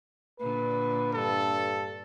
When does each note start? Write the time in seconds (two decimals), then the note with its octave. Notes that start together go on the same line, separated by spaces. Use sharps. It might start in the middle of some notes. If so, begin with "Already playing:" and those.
0.40 A#2 D3 B4
1.15 G2 A4